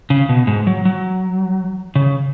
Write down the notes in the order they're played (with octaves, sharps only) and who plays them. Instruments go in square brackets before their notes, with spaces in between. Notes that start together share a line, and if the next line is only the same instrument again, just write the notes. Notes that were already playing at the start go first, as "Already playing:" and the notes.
[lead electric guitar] C#3
B2
G#2
F#3
F#3
C#3